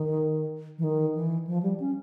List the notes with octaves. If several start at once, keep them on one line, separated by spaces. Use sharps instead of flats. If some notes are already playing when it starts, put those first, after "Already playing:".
Already playing: D#3
E3
D#3
E3
F3
G3
C#4